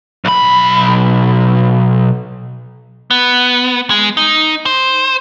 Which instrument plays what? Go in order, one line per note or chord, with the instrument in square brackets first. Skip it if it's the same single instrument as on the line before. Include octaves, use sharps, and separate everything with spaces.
[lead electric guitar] B1 B5
B3
G#3
D#4
C5